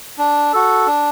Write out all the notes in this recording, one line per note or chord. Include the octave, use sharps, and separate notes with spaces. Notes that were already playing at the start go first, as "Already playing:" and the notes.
D4
F#4 A4
D4